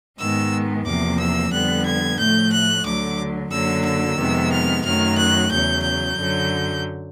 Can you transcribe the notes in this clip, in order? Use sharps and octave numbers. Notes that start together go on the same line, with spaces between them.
G#2 D#3 G#3 B3 E6
E2 C3 F3 A#3 D6
E6
F2 D3 G3 B3 F#6
G#6
A2 F3 A3 G6
F#6
D2 D3 F#3 D6
F#2 D3 F#3 A#3 E6
E6
F2 C3 D#3 G#3 B3
F6
F#2 D#3 F#3 A3 F6
F#6
E2 C#3 F#3 G6
G6
F#2 D3 F#3